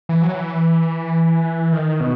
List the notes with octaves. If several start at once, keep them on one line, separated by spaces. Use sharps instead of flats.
E3
F#3
E3
D#3
B2